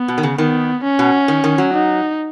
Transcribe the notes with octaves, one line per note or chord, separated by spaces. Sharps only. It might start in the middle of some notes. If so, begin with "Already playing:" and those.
Already playing: B3
B2
D#3
C#3
D#3 B3
C#4
B2
D#3
D#3
F#3
D#4